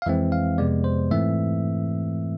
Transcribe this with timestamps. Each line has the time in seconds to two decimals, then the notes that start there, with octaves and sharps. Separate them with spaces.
0.02 F5
0.06 F2 E3 G#3 C4 E5
0.32 F5
0.58 F2 C3 G#3 B3 D5
0.84 C5
1.11 G#2 E3 A3 C4 E5